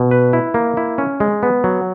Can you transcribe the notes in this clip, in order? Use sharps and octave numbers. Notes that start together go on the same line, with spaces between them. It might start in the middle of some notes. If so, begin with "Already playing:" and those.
Already playing: B2
B4
E4
A#3
E4
C#4
G#3
B3
F#3